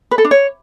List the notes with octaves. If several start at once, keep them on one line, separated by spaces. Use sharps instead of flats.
B4
A4
D4
C#5